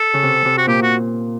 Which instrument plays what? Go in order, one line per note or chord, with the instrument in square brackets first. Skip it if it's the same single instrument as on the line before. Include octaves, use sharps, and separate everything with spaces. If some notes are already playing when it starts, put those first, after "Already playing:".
Already playing: [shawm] A4
[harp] C#3
C3
C3
[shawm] F#4
[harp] A#2 [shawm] G4
[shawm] F#4